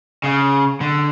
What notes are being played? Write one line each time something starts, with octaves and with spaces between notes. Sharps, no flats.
C#3
D3